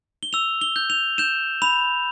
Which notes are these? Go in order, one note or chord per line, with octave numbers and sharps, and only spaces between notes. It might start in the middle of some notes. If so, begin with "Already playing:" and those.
G7
E6 F7
G7
G6
F7
G6 E7
B5 F7